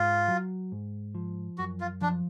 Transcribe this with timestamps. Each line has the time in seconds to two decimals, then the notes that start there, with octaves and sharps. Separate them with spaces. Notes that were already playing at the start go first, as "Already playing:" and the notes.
Already playing: G#2 F4
0.28 F#3
0.72 G#2
1.15 F3
1.58 F#2 F#4
1.80 F4
2.01 F3 D4